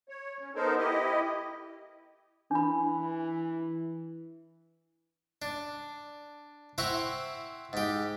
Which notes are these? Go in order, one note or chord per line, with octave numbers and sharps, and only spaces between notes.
C#5
C#4
B3 D#4 A4 A#4 C5
E4 G4 D#5
E3 D4 B5
D4
C4 E4 F#5 A#5 C#6
G#2 G4